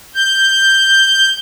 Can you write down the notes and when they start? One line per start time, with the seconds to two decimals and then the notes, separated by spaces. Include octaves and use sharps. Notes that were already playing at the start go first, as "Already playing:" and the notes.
0.15 G6